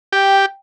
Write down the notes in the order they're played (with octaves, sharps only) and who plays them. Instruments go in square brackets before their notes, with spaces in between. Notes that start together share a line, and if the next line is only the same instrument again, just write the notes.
[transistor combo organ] G4 [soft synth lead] G5